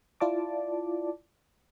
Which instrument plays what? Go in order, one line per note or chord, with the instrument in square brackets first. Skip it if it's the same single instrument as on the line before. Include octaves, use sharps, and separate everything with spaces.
[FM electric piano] E4 F4 D5 A5 D6